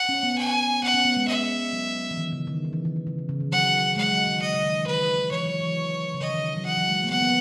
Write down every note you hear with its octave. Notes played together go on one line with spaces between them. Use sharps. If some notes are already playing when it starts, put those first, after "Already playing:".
Already playing: F#5
C#4
B3
G#5
B3 F#5
C#4
B3
G#3
G#3 E5
F#3
E3
D#3
C#3
D#3
D#3
E3
D#3
D#3
C#3
D#3
C#3
D#3
F#3 F#5
G#3 F#5
F#3
D#3
C#3 D#5
C#3
D#3
E3
D#3 B4
D#3
E3 C#5
F#3
E3
C#3
D#3 D#5
D#3
F#3
E3 F#5
F#3
G#3
A#3
B3 F#5
B3